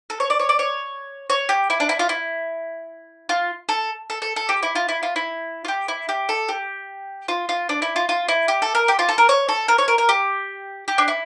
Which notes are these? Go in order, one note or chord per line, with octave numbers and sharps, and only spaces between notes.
A4
C#5
D5
C#5
D5
C#5
C#5
G4
E4
D4
E4
F4
E4
F4
A4
A4
A4
A4
G4
E4
F4
E4
F4
E4
F4
G4
E4
G4
A4
G4
F4
F4
D4
E4
F4
F4
E4
G4
A4
A#4
G4
F4
A4
A#4
C#5
A4
A#4
C#5
A#4
A#4
G4
G4
D4
E4